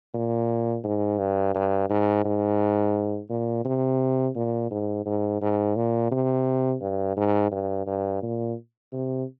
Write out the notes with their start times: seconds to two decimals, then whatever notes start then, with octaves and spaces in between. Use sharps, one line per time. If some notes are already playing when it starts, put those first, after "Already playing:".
0.14 A#2
0.84 G#2
1.19 G2
1.54 G2
1.90 G#2
2.25 G#2
3.30 A#2
3.65 C3
4.36 A#2
4.71 G#2
5.05 G#2
5.41 G#2
5.76 A#2
6.12 C3
6.81 G2
7.17 G#2
7.52 G2
7.87 G2
8.22 A#2
8.92 C3